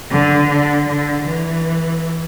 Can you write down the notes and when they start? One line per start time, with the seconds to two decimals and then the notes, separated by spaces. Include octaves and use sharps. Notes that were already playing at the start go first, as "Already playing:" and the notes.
0.10 D3
0.48 D3
0.87 D3
1.25 E3